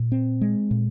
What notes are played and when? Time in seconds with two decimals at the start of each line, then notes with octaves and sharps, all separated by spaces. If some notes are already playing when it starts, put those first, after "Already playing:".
Already playing: A#2
0.12 C4
0.41 G#3
0.71 A#2